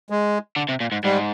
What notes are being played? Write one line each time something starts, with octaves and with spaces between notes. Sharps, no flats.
G#3
D3
C3
A#2
G#2
G#2 G3